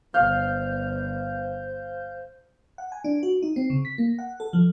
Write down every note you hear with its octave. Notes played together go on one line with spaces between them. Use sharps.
G1 C5 F5 G6
F#5
G#5
D4
F#4
D#4
C4
C#3
B6
A#3
F#5
A4
F3